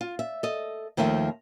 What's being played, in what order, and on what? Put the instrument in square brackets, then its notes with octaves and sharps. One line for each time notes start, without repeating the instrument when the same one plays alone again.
[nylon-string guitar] F4
E5
A4 D#5
D#2 D#3 F3 A3 E5